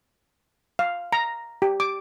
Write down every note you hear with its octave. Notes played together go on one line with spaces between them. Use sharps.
F5
A#5
G4
D6